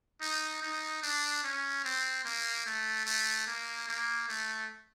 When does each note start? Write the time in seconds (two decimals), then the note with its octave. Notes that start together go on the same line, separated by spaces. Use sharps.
0.21 D#4
0.62 D#4
1.03 D4
1.43 C#4
1.84 C4
2.25 A#3
2.66 A3
3.06 A3
3.47 A#3
3.87 A#3
4.28 A3